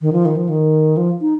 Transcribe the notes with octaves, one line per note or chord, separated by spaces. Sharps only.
D#3
F3
D#3
F3
D#3
F3
D#4